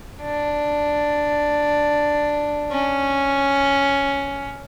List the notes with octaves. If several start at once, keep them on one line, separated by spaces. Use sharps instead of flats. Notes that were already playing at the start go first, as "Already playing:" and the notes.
D4
C#4